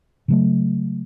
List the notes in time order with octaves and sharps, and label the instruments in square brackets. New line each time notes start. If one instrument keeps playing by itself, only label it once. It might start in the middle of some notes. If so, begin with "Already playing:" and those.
[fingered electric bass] C#3 F#3 A3